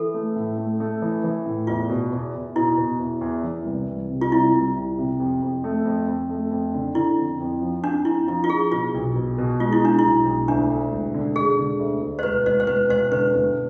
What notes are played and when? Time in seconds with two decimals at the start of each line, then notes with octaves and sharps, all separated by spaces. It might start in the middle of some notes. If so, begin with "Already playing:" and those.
Already playing: E3 A4
0.14 A3
0.36 A2
0.58 A3
0.80 A3
1.02 E3
1.24 E3
1.46 A2
1.67 E2 F4
1.89 B2
2.12 E2
2.34 E2
2.56 B2 E4
2.78 B2
2.99 E2
3.21 E2
3.44 E3
3.65 C2
3.88 C2
4.09 C3
4.21 F4
4.32 C2 E4
4.53 C2
4.75 C3
4.98 C3
5.20 F2
5.42 F2
5.64 A3
5.85 F2
6.08 F2
6.30 A3
6.51 F2
6.74 D3
6.95 D3 E4
7.17 F2
7.40 F2
7.61 F3
7.83 F2 D4
8.05 F2 E4
8.27 F3 E4
8.44 F4
8.50 F3 G#4
8.72 B2 F4
8.94 B1
9.15 B2
9.38 B2
9.60 G#3 F4
9.73 E4
9.82 G#3 D4
9.99 E4
10.04 B1
10.25 B1
10.48 D2 D4
10.70 D2
10.92 E1
11.14 D3
11.36 E1 G#4
11.58 D3
11.79 D2
12.01 D2
12.19 C5
12.23 E1 B4
12.46 E1 C5
12.60 C5
12.67 E1 B4
12.89 E1 C5
13.11 D3 B4
13.34 E1